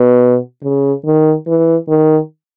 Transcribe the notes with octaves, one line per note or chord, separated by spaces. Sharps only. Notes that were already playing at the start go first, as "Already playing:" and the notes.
Already playing: B2
C#3
D#3
E3
D#3